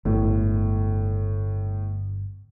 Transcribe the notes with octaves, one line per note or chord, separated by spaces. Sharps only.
G1 A2